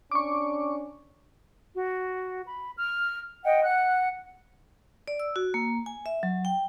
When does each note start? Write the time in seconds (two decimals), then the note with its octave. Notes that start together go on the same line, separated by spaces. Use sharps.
0.11 C#4 D4 C#6 D6
1.76 F#4
2.46 B5
2.77 F6
3.44 D#5 F#5 G5
3.63 F#5 F#6
5.08 D5
5.20 E6
5.36 F#4
5.54 A#3
5.86 G#5
6.06 E5
6.23 F#3
6.45 G5